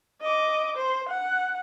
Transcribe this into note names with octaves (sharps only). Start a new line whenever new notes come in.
D#5 D6
C5
F#5